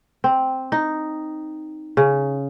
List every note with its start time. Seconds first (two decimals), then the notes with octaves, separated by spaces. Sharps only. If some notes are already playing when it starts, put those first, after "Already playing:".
0.24 C4
0.72 D#4
1.97 C#3